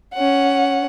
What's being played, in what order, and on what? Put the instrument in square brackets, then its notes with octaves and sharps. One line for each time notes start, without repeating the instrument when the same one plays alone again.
[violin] C#4 F#5